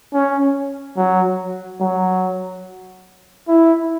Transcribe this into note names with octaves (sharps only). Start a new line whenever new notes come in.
C#4
F#3
F#3
E4